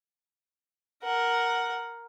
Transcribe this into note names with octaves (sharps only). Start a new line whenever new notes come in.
A#4 F#5